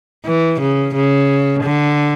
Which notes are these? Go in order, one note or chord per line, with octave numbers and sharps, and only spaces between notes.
E3
C#3
C#3
D3